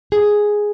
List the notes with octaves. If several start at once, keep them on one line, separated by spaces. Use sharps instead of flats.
G#4